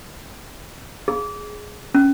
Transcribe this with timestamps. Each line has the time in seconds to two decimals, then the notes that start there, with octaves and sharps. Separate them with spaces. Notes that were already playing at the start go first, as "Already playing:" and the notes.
1.08 G#4
1.95 C#4